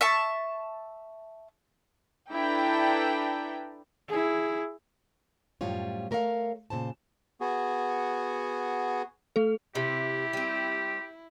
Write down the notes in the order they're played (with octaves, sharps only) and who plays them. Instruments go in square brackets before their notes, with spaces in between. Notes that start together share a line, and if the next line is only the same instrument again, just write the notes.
[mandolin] E5 A5 C#6
[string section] D4 E4 A4 B4 G5 A#5
[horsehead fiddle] E4 G#4
[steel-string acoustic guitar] F#2 A2 F3 G3 F4 C#5
A3 A#4 C#5 D5 F5
A#2 C#3 C5 A5
[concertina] B3 F#4 G#4
[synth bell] A3 A4
[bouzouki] C3 [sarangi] E4 [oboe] G4
[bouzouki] G3 C4